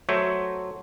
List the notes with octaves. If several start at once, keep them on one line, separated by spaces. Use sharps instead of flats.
F#3 A3 C5 C#5 E5